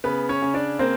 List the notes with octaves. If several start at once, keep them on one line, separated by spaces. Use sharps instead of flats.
C#3 B3 B4
C#4 C#5
C#3
D4 D5
A#3 C4 C5